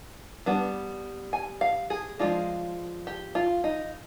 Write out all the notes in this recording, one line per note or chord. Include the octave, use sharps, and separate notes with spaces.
G3 B3 D4
G#5
F5
G#4
F3 G#3 D4 F4
G4
F4
D#4